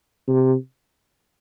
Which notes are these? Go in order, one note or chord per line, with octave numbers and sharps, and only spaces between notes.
C3